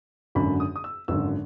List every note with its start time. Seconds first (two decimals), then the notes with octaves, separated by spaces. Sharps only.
0.35 G#1 F#2 D3 B5
0.60 D#6
0.76 D#6
0.84 E6
1.08 G#1 F#2 D3 E6